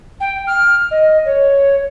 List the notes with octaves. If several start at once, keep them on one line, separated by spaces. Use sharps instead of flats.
G5
F6
D#5
C#5